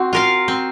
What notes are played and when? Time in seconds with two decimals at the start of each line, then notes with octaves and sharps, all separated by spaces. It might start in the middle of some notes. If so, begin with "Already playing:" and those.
Already playing: C4 F#4
0.13 F4 A#4 F5
0.48 C4